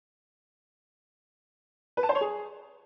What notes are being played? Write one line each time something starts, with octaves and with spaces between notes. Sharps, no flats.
B4
A5
C5
C#5
G#4